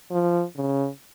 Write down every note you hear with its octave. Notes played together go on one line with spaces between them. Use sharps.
F3
C#3